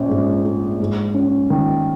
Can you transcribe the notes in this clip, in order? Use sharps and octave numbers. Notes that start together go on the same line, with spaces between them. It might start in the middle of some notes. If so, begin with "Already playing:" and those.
Already playing: A#1 C#4
G#2
G#3
G#2
C#4
D#3